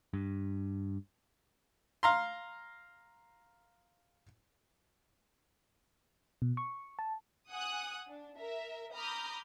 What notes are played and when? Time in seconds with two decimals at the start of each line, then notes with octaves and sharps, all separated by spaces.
0.14 G2
2.03 F5 A#5 C6
6.42 B2
6.57 C#6
6.99 A5
7.50 F#5 G#5 D#6 F#6
8.08 D4
8.39 A#4 E5
8.94 A#5 B5 D6 D#6 F6 G6